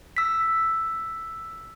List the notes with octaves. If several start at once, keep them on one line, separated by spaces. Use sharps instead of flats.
E6 B6